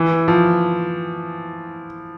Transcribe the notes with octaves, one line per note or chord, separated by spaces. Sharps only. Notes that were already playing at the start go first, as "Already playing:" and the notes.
Already playing: E3
F3